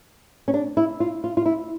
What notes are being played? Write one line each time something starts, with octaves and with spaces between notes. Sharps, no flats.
C#4
D4
E4
F4
F4
F4
E4